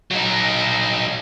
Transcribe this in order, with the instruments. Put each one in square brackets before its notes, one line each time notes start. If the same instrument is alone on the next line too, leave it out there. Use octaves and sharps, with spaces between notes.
[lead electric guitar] F#3 D#4